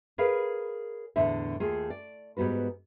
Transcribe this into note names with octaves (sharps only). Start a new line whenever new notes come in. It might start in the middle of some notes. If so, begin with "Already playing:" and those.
G#4 A#4 B4 C#5 F5
E2 A2 D3 E5
D#2 A3 F4 G#4
D5
G#2 G3 B3 F#4 B4